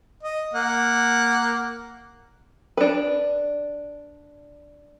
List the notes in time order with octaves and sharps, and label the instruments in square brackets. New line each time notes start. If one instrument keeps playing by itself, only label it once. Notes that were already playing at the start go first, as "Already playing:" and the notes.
[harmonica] D#5
A#3 F#5
[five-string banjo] D4 B4